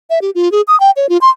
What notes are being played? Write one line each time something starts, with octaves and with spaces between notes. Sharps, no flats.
E5
G4
F4
G#4
D#6
G5
C#5
F4
C6